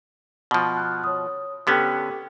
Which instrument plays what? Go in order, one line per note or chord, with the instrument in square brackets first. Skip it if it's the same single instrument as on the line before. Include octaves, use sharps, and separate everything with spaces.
[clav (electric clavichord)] B2 F3
[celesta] F6 F#6
C#5 D#6
[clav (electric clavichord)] D3 B3 C#4 [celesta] G4 A4 G5